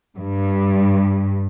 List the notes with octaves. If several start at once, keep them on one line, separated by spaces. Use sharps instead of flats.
G2